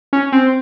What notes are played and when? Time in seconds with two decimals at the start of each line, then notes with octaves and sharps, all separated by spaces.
0.13 C#4
0.32 C4